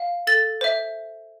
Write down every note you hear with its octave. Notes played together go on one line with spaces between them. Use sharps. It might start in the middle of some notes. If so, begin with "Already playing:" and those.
Already playing: F5
A4 A6
C5 E5